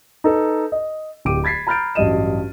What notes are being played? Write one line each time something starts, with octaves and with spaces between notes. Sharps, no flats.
D#4 A4 B4
D#5
D1 G4 D6 D7 D#7
B5 G#6 A6 B6 C7
A#5 B5 F6 G6 A6 D7
A1 G2 F#3 D#5 D#7 E7